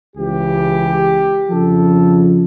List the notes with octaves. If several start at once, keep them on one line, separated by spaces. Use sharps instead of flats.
C#2 C#3 E3 G4
F2 C#3 F3 A4